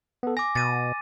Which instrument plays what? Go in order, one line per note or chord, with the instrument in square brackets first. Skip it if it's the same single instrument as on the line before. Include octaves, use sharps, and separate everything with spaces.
[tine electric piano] B3 A4
[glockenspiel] G#5 D6 [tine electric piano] A#6
[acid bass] B2 [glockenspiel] A6 D#7